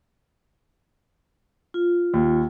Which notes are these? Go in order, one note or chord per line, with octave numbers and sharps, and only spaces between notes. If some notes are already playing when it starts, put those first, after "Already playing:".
F4
D#2